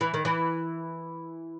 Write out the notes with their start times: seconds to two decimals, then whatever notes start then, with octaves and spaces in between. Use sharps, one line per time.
0.01 E3
0.14 D#3
0.25 E3